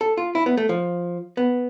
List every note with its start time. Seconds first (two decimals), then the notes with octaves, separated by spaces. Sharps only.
0.01 A4
0.17 F4
0.35 E4
0.46 B3
0.57 A3
0.69 F3
1.37 B3